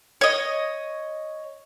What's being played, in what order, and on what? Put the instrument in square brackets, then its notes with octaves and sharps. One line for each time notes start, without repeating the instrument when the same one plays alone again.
[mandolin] C#5 D#5